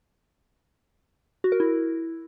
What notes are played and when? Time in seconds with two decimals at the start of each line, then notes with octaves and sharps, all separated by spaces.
1.44 F#4
1.52 A#4
1.60 E4